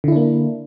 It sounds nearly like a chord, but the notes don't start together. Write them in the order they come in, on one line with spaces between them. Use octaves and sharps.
D3 E4 D4 A#3